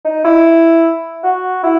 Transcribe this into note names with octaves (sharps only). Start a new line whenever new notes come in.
D#4
E4
F#4
E4